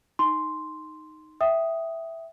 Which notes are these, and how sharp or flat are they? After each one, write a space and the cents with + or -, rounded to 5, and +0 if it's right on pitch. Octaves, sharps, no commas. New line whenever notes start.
D#4 +0 C6 +0
E5 +0 G5 -25 D#6 +0